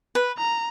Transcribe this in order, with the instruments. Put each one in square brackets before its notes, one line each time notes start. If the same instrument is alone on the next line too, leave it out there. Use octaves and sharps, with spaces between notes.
[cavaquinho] B4
[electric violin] A#5